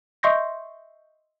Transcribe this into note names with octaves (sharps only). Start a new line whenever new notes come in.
D#5 E5 C6 C#6 G6 A#6